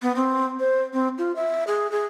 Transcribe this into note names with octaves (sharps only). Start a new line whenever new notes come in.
B3
C4
C5
C4
F4
E5
G#4
G#4